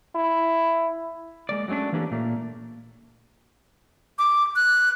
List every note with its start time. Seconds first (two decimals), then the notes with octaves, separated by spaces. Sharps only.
0.15 E4
1.49 G#3 A#3 D5
1.68 F#3 G#3 A3 C#4 D4
1.93 E3 A#3 C#4 D4 G4 A4
2.11 A#2 A3 A#3
4.19 D6
4.56 F#6